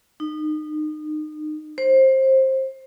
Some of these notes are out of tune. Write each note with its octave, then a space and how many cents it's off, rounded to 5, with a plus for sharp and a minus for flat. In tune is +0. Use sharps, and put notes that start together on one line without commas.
D#4 -30
C5 +20